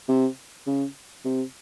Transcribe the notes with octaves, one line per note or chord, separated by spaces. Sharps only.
C3
C#3
C3